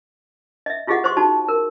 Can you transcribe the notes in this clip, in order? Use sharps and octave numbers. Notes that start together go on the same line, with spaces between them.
D#5 E5
E4 F4 G4 G#4 D#5 F#5
C5 D#5 C6 C#6
D#4 F#4 A5
A#4